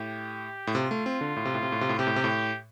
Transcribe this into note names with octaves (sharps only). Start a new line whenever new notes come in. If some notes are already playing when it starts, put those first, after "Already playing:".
Already playing: A2 G4
A2
C3 F4
A3
C4
D3
A2
C3
A2
C3
A2
C3
A2
C3 G4
A2
C3
A2